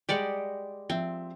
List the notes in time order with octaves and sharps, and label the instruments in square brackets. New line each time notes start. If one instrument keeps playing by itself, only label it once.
[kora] G3 G#3 D#5 [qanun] G4 D5 F#5
[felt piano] F3 E5 [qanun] C4